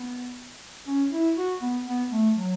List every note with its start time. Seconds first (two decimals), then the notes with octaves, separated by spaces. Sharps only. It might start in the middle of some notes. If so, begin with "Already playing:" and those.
Already playing: B3
0.87 C#4
1.12 E4
1.37 F#4
1.62 B3
1.87 B3
2.12 A3
2.36 F#3